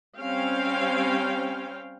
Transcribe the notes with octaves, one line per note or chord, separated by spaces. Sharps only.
G3 C4 C#4 F5 G5